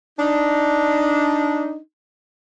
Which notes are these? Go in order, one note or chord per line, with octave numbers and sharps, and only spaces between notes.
D4 D#4